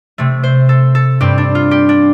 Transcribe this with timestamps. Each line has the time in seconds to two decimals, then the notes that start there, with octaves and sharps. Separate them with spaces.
0.18 C3 A3 C4
0.43 C5
0.69 A4
0.95 A4
1.20 G2 G3 C4 G4
1.38 D4
1.55 F4
1.71 G4
1.89 D4